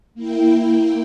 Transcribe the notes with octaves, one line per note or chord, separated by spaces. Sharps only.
A#3 E4 G5